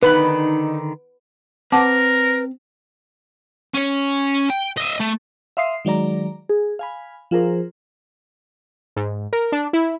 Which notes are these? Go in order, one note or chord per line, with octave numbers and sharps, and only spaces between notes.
D3 D#3 D#4 B4 B5
C4 A#4 B4 F#5 A5 D6
C#4 C#5
G5
D#5 E5
A3
E5 F5 C6 D#6 C7
D#3 F#3 G#3 D5 A#5
G#4
F5 G#5 B5
F3 F4 G#4 A#4 C5
G#2
A#4
D4
E4